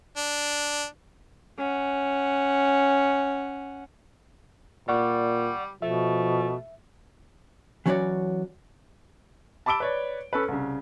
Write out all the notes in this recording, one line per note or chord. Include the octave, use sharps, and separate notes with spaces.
D4
C#4 F#5
A#2 G3 D5 F#5 C#6
B2 F3 A3 E5
E3 F#3 C#4 F#4 C#5 D5
A5 B5 D6 E6 D7 G7
B4 C#5 D5
C#4 A4 B4
C2 C#3